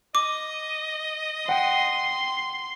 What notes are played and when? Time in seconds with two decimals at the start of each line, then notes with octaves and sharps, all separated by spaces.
0.15 D#5 D6
1.49 F#5 G5 C6